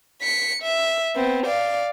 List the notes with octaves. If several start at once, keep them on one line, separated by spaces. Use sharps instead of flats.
B6 C#7
E5
B3 C4
D5 F5